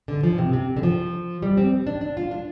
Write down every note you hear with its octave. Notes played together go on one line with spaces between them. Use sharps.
D3
F3
C3
C3
D3
F3
G3
C4
D4
D4
F4
D4